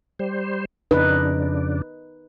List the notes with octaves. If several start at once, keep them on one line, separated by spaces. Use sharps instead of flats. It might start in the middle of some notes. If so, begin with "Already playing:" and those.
G3 C5
F2 C#3 D4 D#4 B4